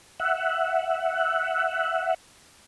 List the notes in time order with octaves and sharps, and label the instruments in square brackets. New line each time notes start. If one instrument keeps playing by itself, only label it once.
[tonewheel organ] E5 F#5